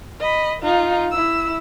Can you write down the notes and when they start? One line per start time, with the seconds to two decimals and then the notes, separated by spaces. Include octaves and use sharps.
0.20 D#5 B5
0.62 D#4 F4
1.11 E4 E6